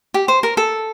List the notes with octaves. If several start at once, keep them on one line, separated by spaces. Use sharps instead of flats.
G4
C5
A#4
A4